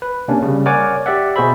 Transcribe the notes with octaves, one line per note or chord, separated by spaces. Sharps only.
B4
C3 A#3 C#4 D4
C#3 G3
A#4 C#5 D5 F#5 G#5 D6
G4 D5 E5 F#5
B2 F#4 G#4 C5 E5 B5